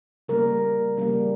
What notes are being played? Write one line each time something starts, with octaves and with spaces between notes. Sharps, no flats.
C#3 G3 A#3 A#4
C#3 G3 A#3